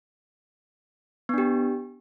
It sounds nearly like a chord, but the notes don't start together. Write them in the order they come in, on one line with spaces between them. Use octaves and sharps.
B3 D4 G4